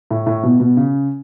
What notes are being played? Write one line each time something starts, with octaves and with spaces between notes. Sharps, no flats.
A2
A2
B2
B2
C#3